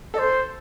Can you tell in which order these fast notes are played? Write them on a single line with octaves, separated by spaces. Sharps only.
A4 D#5 C5